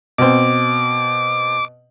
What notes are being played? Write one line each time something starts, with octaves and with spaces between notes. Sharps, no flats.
B2 C4 D6